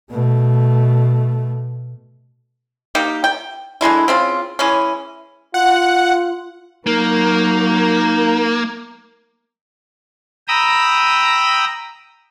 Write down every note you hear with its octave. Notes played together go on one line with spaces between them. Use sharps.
B2 A3
G3 A#3 D#4 G4
G5
D3 E3 G#3 E4
C#3 C4 F4
E3 G#3 C#4
F4 F#5
F#3 A#3 D#4 A#4
G5 A#5 B5 D#6 E6